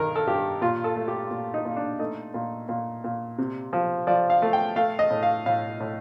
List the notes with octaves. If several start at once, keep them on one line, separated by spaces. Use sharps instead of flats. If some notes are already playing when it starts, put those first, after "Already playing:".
Already playing: G2 D#3 A#4
A4
G2 G4
A#2 F4
A4
A3
G4
A#2
D#4
A#2
D4
A3 D#4
A#2
A#2
A#2
C3
F3
F3 D5
F5
A3
G5
A3 F5
D#5
A2
F5
A2 F5
A2